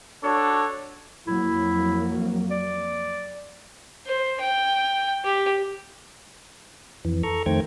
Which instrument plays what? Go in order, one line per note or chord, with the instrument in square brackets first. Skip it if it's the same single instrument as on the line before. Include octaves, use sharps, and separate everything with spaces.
[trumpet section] D4 F#4 A4 C#5
[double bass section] F2 F#3 A#3 [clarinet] E4
[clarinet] D5
[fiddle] C5
G5
G4
[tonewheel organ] F2 E3
A4 A#5 C#6
F2 D#3 A3 C5 G5 G#6